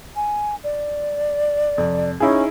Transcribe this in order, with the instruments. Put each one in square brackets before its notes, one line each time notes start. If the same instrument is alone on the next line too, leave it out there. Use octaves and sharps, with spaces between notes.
[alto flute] G#5
D5
[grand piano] F2 C3
[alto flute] C#4 [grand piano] D#4 E4 G#4